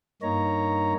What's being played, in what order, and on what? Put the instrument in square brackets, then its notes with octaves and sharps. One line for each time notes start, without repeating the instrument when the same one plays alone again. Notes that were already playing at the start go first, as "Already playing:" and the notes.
[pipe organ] G2 A#3 D#4 C#5 A#5